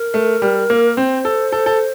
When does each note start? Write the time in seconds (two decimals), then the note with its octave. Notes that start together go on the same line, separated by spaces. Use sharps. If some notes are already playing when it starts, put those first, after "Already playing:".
Already playing: A#4
0.14 A3
0.42 G3
0.70 A#3
0.97 C4 C5
1.25 A4
1.52 A4
1.66 A4